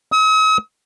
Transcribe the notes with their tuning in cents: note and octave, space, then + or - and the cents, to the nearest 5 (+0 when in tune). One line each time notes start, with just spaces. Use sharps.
D#6 +45